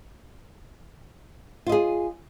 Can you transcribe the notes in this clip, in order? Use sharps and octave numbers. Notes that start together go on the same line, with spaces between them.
F4 G#4 D#5